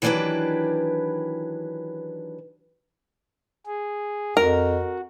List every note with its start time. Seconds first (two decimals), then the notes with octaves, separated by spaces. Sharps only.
0.02 D#3 E3 F#3 D4 G4 B4
3.66 G#4
4.37 F2 F#4 A#4